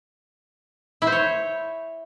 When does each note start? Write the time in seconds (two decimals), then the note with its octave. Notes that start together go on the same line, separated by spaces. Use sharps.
1.02 E4
1.07 C5
1.12 C#5